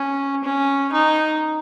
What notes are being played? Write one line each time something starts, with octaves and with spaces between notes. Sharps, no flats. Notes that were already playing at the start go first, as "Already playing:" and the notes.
Already playing: C#4
C#4
D#4